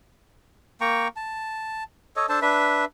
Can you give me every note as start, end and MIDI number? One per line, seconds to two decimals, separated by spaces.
0.81 1.08 58
0.81 1.08 79
0.81 1.08 82
0.81 1.08 85
1.16 1.83 81
2.16 2.26 69
2.16 2.26 73
2.16 2.26 75
2.29 2.40 62
2.29 2.40 69
2.29 2.40 72
2.29 2.40 81
2.42 2.85 62
2.42 2.85 71
2.42 2.85 76